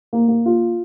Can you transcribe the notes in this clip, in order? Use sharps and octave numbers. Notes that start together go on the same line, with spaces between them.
A#3
A#3
F4